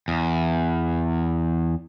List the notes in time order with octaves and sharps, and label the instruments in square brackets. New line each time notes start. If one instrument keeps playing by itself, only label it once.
[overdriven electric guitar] E2